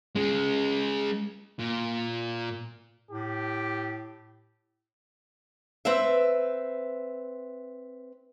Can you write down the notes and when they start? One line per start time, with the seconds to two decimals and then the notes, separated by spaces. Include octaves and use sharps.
0.16 G#3 C#4
1.60 A#2
3.11 A2 G4
5.85 C4 B4 E5